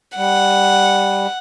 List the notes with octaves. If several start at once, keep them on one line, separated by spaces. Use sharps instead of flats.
G3 F#5